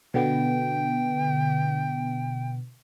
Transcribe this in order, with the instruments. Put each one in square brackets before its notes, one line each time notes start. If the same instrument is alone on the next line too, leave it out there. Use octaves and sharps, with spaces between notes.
[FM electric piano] B2 D3 B3 [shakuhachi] G5